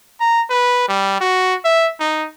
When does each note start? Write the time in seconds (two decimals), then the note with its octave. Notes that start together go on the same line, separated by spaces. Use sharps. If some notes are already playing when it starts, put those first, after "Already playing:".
0.20 A#5
0.50 B4
0.88 G3
1.21 F#4
1.65 E5
2.00 D#4